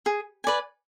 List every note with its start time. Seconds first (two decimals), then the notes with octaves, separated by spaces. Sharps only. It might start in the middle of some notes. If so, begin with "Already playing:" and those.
0.06 G#4
0.44 B4 D5 G#5